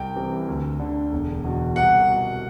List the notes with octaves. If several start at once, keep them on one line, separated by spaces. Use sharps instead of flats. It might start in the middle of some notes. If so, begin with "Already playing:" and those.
Already playing: C2 G5
C3 E3
D2
D3
E1
E2 B2
C2 F#5
B2